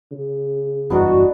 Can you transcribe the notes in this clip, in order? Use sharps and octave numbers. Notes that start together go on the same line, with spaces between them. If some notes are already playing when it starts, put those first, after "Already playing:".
C#3
F#1 E2 G2 B3 D4 D#4 F#4